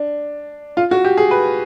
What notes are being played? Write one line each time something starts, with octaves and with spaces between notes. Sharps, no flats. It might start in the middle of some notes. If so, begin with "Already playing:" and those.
Already playing: D4
F4
F#4
G4
G#4
B4